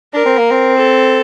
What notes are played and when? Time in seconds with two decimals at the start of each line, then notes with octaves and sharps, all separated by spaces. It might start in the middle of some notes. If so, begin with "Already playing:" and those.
0.14 D4 A#4
0.26 C4
0.38 A#3
0.51 C4
0.77 A4